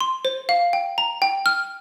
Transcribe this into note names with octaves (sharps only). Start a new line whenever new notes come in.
C6
C5
F5
G5
A#5
G5
F6